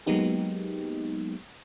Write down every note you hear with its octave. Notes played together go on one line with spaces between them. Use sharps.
F#3 G#3 A#3 B3 D#4 G4